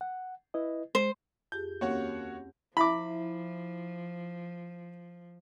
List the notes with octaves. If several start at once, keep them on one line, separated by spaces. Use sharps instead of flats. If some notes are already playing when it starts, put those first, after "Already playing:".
F#5
E4 B4 D#5
G#3 C5
F2 G4 G#4 G6
D#2 A#3 C4 C#4 F#4 G4 C#5 F#5
F3 E4 E5 B5 D6